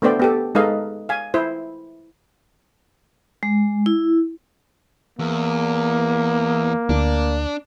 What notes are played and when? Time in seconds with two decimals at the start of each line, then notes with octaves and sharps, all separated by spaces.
0.02 A3 B3 D4 C5 D5 G5
0.20 B3 G4 A4
0.55 G#3 D#4 A4 B4 D#5 F5
1.09 F5 G#5
1.34 E4 C5
3.43 G#3
3.86 E4
5.19 E2 A#3
6.89 D2 D4